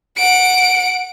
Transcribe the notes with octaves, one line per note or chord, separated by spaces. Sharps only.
F#5 D7